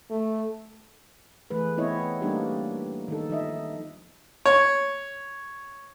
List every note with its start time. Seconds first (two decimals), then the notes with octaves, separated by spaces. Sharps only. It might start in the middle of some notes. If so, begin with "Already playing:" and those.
0.10 A3
1.50 E3 A3 G#4 B4
1.77 B3 C4 E4 C#5 D#5
2.22 G3 A3 A#3 D4 D#4 G4
3.08 D#3 D#4 A4
3.29 F3 D#4 D#5 E5
4.46 C#5